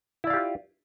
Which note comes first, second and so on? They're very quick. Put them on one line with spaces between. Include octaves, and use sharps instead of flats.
E4 D5 F5 G4 F4